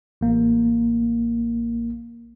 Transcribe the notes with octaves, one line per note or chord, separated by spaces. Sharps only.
A1 A#3